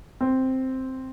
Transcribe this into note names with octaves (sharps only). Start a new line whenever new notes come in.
C4